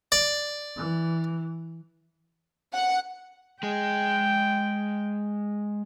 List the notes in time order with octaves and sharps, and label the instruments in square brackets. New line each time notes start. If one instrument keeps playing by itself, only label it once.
[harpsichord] D5
[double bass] E3
[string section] F#5
[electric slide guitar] G#3 G#4 [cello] G5